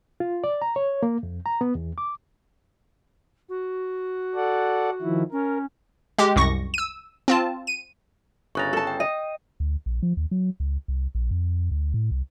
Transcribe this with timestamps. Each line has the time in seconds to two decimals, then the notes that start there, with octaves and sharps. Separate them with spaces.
0.20 F4
0.44 D5
0.62 A#5
0.76 C#5
1.03 A#3
1.23 F2
1.46 A#5
1.61 B3
1.75 E2
1.98 D6
3.49 F#4
4.35 A4 D5 F#5
5.02 D#3 F3 E4
5.32 C#4 A#4
6.18 G#3 G4
6.36 C2 F#2 C#6 A#6
6.74 E6 D#7
7.28 C4 F4 A5
7.67 D#7
8.55 G1 C#3 A#5 C#6 F#6 A6
8.73 A4 A5
8.87 G5
9.00 D#5
9.60 D2
9.86 A#1
10.03 F3
10.17 D#2
10.31 F#3
10.60 C#2
10.88 C2
11.15 A#1
11.31 F2
11.71 D2
11.94 A2
12.11 C2